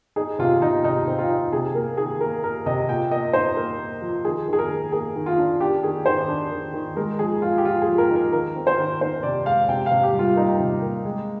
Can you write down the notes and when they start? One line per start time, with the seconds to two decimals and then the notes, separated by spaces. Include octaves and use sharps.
0.16 D#4 G#4
0.39 C3 F4
0.62 C3 D#4
0.84 C3 D#4
1.08 C4
1.19 F4
1.30 D#4
1.53 C3 G#4
1.75 A#3 A#4
1.97 D#3 G#4
2.20 A#3 A#4
2.43 A#3 A#4
2.66 C3 D#5
2.89 A#2 G5
3.11 A#3 D#5
3.33 D#4 C5
3.56 A#3 A#4
3.79 A#3
4.02 F3
4.25 D#3 G#4
4.47 D#3
4.53 G#4
4.59 A#4
4.70 D#3
4.92 A#3 G#4
5.16 D#3
5.26 F4
5.38 D4
5.60 D4 G4
5.83 D#3 G#4
6.06 D#3 C5
6.28 D4
6.51 D#3
6.74 D#3
6.96 G#3 A#4
7.19 F3 G#4
7.42 F3 F4
7.58 G4
7.65 F3 F4
7.81 G#4
7.88 F3
7.98 A#4
8.10 D#4
8.16 A#4
8.32 D#3 A#4
8.56 C4
8.67 C5
8.78 D#3
9.01 D#3 C5
9.23 C3 D5
9.46 G#3 F5
9.69 C3 G5
9.86 C3 F5
10.03 G4
10.14 G3 F4
10.36 A#3 D#4
10.60 C3
10.82 A#3
11.05 G#3